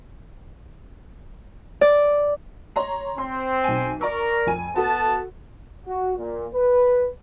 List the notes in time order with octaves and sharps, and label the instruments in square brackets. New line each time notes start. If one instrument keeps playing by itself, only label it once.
[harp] D5
[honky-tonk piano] C#5 A#5 C6
[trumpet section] C4 [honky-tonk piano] C6
[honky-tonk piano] B1 G#5
[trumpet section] A#4 [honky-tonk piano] D5 A#5 C#6
[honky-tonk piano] F2 G#5
[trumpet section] B3 A5 [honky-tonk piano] F#4 A4
[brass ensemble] F#4
A#2
B4